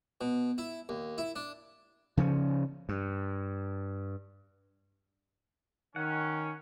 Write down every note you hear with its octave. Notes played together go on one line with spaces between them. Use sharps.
B2
E4
D#2
E4
D4
C#3 F3 C#4
G2
D#3 C#4 F#5